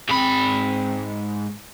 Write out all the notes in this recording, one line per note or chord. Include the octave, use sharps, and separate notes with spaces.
G#2 C4 B5